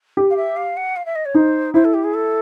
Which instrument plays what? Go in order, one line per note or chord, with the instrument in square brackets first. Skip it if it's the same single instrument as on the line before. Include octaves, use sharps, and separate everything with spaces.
[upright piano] G4
[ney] F5
E5
F5
F#5
F5
E5
D#5
C#5
[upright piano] D#4 [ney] C5
[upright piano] E4 [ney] C5
[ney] A4
G4
G#4
A4